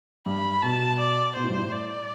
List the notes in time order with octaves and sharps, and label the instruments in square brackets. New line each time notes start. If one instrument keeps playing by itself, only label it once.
[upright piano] G2 [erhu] B5
[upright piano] B2 [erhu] A5
[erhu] D5
[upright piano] B2 [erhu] C5
[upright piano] A2
G2
A2
[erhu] D5